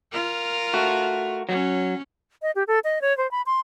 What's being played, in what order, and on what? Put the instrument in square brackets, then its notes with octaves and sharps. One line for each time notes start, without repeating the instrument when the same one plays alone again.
[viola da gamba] F4 A#4
[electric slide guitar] A3 F#4
[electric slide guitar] F#3 [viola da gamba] C#4
[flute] D#5
G4
A4
D#5
C#5
C5
B5
C6